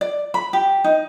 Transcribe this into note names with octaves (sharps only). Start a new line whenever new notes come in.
D5
B5
G4
D#4